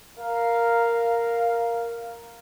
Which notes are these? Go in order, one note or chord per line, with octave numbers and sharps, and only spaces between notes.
A#4 F5